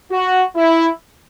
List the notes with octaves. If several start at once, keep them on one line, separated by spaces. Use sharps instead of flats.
F#4
E4